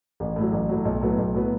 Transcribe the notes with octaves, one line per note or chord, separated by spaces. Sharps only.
A1
A2 F#3
A1
A2 F#3
B1
A2 F#3 B3
B1
A2 F#3 B3